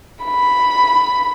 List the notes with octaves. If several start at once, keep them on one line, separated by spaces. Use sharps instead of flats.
B5